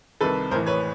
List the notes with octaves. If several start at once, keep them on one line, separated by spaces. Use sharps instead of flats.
C2 C3 D#3 A4 B4
A1 A2 E3 A#4 C5
B4 C#5